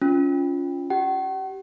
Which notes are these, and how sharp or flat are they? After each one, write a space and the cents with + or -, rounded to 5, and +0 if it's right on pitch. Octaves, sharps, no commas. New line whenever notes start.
C#4 +25 F4 +0
G4 -20 F#5 +45